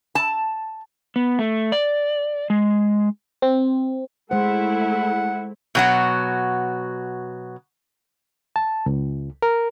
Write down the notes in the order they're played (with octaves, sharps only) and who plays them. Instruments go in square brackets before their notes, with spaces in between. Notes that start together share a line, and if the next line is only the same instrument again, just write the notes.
[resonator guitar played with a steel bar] A5
[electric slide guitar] B3
A3
D5
G#3
[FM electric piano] C4
[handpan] G#3 C5 [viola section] A3 E4 [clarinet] F#5
[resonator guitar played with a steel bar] B2 F#3 F#4
[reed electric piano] A5
C#2
A#4